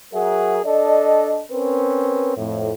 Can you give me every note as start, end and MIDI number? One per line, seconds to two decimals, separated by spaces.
0.13 0.58 54
0.13 0.58 68
0.13 0.58 70
0.13 0.58 76
0.13 0.58 78
0.65 1.41 62
0.65 1.41 69
0.65 1.41 74
0.65 1.41 75
1.51 2.33 60
1.51 2.33 61
1.51 2.33 70
1.51 2.33 71
2.37 2.71 41
2.37 2.71 45